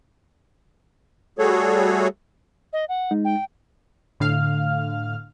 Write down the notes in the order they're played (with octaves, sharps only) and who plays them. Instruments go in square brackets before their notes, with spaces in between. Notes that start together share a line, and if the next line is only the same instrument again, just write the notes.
[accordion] G3 A3 F#4 G#4 A4 C#5
[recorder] D#5
F#5
[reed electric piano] G#3 D#4
[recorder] G5
[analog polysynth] A2 D3 F5 F6